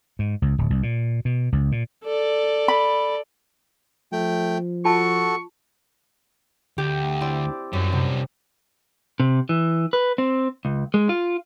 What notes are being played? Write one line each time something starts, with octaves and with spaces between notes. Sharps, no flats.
G#2
C#2
D1
C2
A#2
B2
C#2
A#2
A4 D5
B5
F3 A3 G5
F4 F#4 A4 A5 C#6
D2 G4
C4 E4 D5
F#2 G3 C#4
C3
C3
E3
B4
C4
C#2
G#3
F4